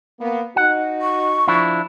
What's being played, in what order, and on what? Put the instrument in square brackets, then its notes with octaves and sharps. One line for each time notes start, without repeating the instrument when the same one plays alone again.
[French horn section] A#3 B3
[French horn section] D#4 F#4 [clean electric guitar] F#5
[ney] C#6
[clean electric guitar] F3 D4 E4